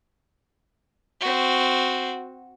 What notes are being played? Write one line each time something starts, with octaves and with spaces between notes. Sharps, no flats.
C4 F#4